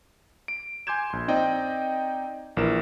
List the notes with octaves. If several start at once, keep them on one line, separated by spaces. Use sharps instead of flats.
D7
G#5 C6 D6 G6 G#6 E7
A#1 C6
C4 D#4 D5 D#5 G5
A#1 E3 A#4 E7